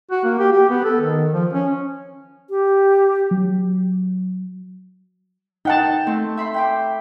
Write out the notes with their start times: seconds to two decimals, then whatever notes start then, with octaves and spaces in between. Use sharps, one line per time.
0.11 F#4
0.25 A#3
0.39 G4
0.52 G4
0.70 B3
0.85 A4
1.01 D#3
1.34 F3
1.53 C#4
2.50 G4
3.31 F#3
5.65 D#4 F#5 G5 A5
6.07 A3 C4
6.37 E5 B5 C6
6.54 G5 B5 D6